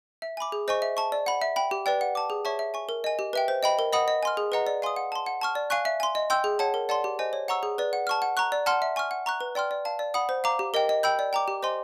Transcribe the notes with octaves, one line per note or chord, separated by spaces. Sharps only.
E5
G#5 B5 D6
G#4
C5 D#5 G#5 C#6
E5
A5 C#6
D5
F#5 B5
E5
G5 B5
G4
B4 D5 G5
F#5
A5 D6
G#4
C#5 E5 A5 C#6
E5
G#5 C#6
A#4
D#5 G#5
G4
B4 E5 G5
C5
D#5 G5 B5
A#4
D#5 F#5 B5 D#6
D#5
G#5 C6 F6
G#4
B4 D#5 F#5 A#5
D5
F5 G#5 C6 D#6
F#5
A5 C6
F#5
A5 C#6 F6
D5
F5 G#5 C#6 F#6
E5
G#5 C6
D#5
G5 C6 E6 G6
G#4
C#5 F#5 A5
A#4
D5 F#5 A5 C6
G4
C5 D#5 G#5
C#5
F#5 A#5 C#6 E6
G#4
B4 D5
F#5
A5 C#6 F6
F#5
A#5 C#6 F#6
D5
F#5 A5 C6 F6
E5
G#5 C#6 F6
F#5
A#5 C#6 F#6
B4
D5 G5 C6 F6
D5
F5 A5
D5
F#5 B5 D#6
C5
F5 A#5 D6
G4
A#4 D#5 G5
D#5
G5 B5 E6 G6
D5
G5 A#5 D6
G4
C5 D#5 G#5 C6